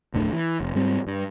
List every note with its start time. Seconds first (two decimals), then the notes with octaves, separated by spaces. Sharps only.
0.14 F1 D2 A2 D3
0.32 E3
0.61 F1
0.75 G#2 G3 C4
1.07 G2